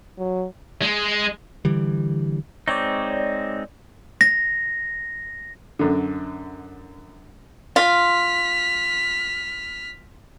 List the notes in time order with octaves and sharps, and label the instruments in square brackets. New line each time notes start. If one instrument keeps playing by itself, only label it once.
[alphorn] F#3
[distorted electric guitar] G#3
[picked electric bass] D3 E3 G3
[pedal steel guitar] G#3 C4 D#4 [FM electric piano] C#5 D5
[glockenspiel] A#6
[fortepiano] F#2 D3
[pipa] F4 [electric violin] F6 B6